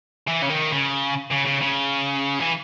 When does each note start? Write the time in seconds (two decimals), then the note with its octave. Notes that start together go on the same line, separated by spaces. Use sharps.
0.28 E3
0.42 C#3
0.50 D#3
0.73 C#3
1.32 C#3
1.47 C#3
1.62 C#3
2.40 E3